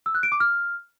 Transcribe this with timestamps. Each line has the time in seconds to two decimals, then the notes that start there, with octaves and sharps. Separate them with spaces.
0.06 E6
0.15 F#6
0.23 D7
0.32 D6
0.40 F6